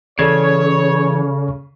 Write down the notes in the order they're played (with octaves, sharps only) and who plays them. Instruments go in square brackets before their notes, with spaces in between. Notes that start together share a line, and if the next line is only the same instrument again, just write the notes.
[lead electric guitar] C#3 [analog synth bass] E3 [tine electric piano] A4 D5 G#6 [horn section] C#5